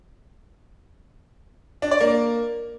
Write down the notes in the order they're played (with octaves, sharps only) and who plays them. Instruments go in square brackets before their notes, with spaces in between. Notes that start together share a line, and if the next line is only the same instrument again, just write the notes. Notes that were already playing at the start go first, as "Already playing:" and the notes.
[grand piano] D4
D5
A#3